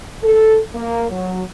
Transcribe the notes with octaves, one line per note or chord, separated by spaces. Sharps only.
A4
A#3
F#3